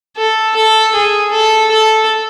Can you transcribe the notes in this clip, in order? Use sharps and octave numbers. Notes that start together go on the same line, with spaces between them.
A4
A4
G#4
A4
A4